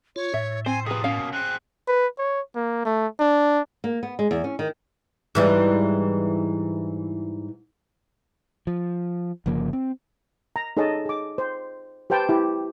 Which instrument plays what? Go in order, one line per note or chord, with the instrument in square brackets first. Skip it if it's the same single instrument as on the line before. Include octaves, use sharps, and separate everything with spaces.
[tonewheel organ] F4 [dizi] C#5
[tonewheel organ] A2 [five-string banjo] E5
[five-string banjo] C4 [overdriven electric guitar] C5 [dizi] G#5
[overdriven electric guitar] C3 F3 [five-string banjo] G#4 B4 [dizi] D#6
[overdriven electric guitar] B2 A#3 [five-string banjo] C#4 F5
[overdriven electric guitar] C4 G#4 [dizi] F#6
[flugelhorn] B4
C#5
A#3
A3
D4
[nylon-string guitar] A#3
B3
G#3
E2
C#4
D#3
[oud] G#2 E3 G3
[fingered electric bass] F3
G1 C#3 F3 A#3
C4
[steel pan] A#5
D#4 G#4 A4 C#5 D#5 A5
G#4 D6
C5
G4 B4 C5 G5 A5
E4 G4